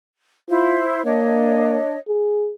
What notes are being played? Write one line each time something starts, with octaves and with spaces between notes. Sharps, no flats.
E4 F4 C5
A#3 D4 C#5 D#5
G#4